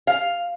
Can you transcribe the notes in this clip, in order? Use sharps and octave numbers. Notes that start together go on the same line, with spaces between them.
F5